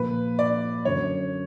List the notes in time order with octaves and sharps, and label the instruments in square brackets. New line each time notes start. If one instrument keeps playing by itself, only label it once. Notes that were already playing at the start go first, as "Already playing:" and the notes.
Already playing: [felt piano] A#2 F3 A#3 [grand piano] B4
[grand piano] D5
[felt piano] F#2 D3 F#3 [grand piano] C#5